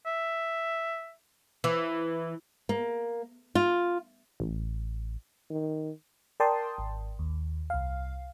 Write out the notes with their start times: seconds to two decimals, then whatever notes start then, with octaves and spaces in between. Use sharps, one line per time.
0.06 E5
1.64 E3
2.69 A#3
3.55 F4
4.40 A1
5.50 D#3
6.40 A#4 D5 G5 A5 C6 D#6
6.78 G#1
7.19 D#2
7.70 C2 F5